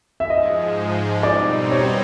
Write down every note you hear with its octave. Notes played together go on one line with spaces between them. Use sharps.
E5
G#2 F3 G#3 D#5
B2 G3 C4 D#4 D5
C#5